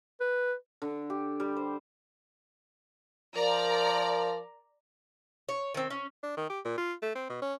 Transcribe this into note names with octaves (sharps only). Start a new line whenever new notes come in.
B4
D3
G4
G3
C5
F3 A#4 D5 A#5
C#5
D#3 C4
C#4
D4
D#3
G4
A#2
F4
A3
C4
B2
C#4